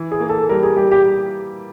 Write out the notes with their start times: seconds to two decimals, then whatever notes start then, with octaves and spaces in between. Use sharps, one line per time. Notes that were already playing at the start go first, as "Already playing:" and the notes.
Already playing: E3
0.12 G#4
0.20 A#3
0.29 A4
0.49 G3 A#4
0.63 G#4
0.76 G3 G4
0.92 G4